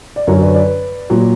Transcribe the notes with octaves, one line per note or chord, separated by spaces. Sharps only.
D5
F#2 D3 F#3 A#4 C#5
B4 D5
B4 D5
A#2 F#3